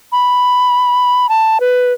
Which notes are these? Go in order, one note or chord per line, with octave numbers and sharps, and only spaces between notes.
B5
A5
B4